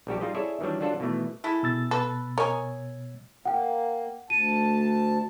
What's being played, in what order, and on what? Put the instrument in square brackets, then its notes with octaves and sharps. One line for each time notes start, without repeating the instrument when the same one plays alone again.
[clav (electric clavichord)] A#1 G3 F#4 G4
G3 D#4 F4 G#4 D#5
E4 G#4 A4 C#5 D5 E5
D#3 E3 F#3 G3 D4
D3 F#3 D4 F4 A4 F#5
B2 D#3 E3 A3
[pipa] G#3 E4 A4
[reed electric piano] B2 E6 A6
[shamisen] A4 [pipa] B4
[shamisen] A#4 [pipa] C#5 D#5 G#5
[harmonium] A#3 [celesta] F#5 G5
[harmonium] D2 A5 [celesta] D#7